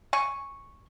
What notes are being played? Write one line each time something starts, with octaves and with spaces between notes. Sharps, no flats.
G#5 C#6